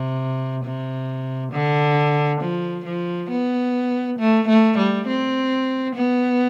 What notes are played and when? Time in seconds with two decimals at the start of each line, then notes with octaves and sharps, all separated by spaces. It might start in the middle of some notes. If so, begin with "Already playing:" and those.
Already playing: C3
0.64 C3
1.52 D3
2.41 F3
2.86 F3
3.30 B3
4.19 A3
4.48 A3
4.78 G3
5.07 C4
5.95 B3